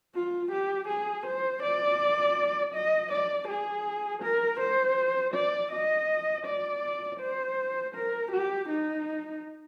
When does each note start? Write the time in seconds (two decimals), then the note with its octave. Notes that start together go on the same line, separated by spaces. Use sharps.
0.15 F4
0.52 G4
0.88 G#4
1.26 C5
1.63 D5
2.74 D#5
3.12 D5
3.48 G#4
4.23 A#4
4.60 C5
5.34 D5
5.72 D#5
6.46 D5
7.20 C5
7.95 A#4
8.32 G4
8.69 D#4